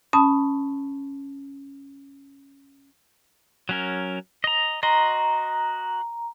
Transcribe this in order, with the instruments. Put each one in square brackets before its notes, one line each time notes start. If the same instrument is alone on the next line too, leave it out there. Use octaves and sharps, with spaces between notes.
[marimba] C#4 A5 B5 D#6
[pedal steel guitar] F#3 C#4 A#4
D#5 A#5
[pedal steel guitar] F#4 D#5 C6 [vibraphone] A#5